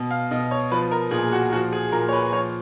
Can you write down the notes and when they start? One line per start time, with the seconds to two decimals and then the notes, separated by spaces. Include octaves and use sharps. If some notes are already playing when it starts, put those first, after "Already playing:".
Already playing: B2
0.11 F5
0.31 B2 D#5
0.51 C#5
0.71 F3 B4
0.91 A#4
1.11 A#2 G#4
1.32 F#4
1.52 F3 F#4
1.72 G#4
1.92 A#2 A#4
2.09 C#5
2.13 B4
2.32 F3 C#5